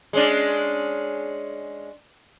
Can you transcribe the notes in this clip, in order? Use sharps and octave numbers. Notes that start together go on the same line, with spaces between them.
G#3 C#4 D4